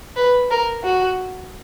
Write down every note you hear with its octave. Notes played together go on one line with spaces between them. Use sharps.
B4
A#4
F#4